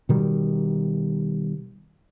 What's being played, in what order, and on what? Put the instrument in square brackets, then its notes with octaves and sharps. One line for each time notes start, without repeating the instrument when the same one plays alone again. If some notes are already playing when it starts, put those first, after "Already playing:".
[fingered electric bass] B2 D#3 G3